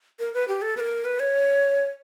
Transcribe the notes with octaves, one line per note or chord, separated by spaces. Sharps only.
A#4
B4
G4
A4
B4
A#4
B4
C#5